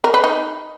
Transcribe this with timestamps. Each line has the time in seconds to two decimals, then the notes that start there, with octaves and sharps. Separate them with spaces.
0.04 A#4
0.14 B4
0.24 D#4